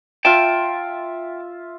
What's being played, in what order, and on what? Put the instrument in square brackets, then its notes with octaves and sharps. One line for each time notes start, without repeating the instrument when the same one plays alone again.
[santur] F4 E5 [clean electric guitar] G5 A5